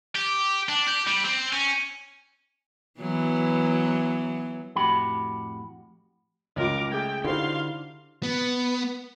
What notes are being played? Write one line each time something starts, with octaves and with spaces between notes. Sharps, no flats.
G4
D4
G4
G3
C4
C#4
E3 F#3 B3
F2 A2 F#4 G4 B5
C#2 F4 A#4 D6
A3 G#4 G5 G#6
D3 D#4 E4 F#4 G4 C5 F5 C6
B3